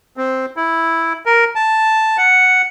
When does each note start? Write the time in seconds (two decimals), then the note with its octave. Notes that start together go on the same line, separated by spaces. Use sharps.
0.17 C4
0.57 E4
1.26 A#4
1.56 A5
2.18 F#5